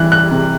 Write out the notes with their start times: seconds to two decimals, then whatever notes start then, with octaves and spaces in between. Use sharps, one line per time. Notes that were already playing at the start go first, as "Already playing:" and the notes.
Already playing: C3 E3 G3 F#6
0.12 F#6
0.31 C3